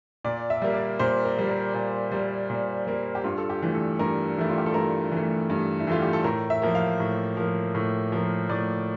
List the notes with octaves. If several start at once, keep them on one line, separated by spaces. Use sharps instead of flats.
A#2 D5
E5
G3 A#3
D5
A#2 C5
A#4
G3 A#3
A#4
A#2
G3 A#3
A#2
G3 A#3
G4
G2 F4
A4
G4
E3 A3
A4
G2 A#4
E3 A3 E4
F4
G4
A4
G2 A#4
E3 A3
G2
E4
E3 A3 F4
G4
A4
A2 A#4
E5
F3 A#3
F5
A2
F3 A#3
A2
F3 A#3
A2 D5